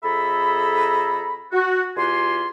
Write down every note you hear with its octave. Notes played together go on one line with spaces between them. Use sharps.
F2 G#4 A4 E5 A#5 B5
F#4
E2 F4 G4 G#5 C6